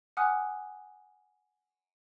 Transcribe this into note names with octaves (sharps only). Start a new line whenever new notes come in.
F#5 G#5 D6 D#6 F6 F#6